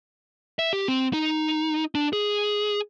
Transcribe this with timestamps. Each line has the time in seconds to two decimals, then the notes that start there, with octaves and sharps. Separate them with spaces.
0.59 E5
0.73 G4
0.88 C4
1.13 D#4
1.95 D4
2.13 G#4